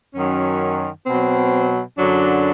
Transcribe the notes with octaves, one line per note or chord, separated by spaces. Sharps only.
F#2 D#3 F#3 C#4
B2 F#3 C4
F#2 D3 F#3 D4